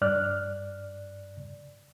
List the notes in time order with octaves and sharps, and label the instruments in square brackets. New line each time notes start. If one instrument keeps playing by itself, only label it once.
[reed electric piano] G2 D5 F6 F#6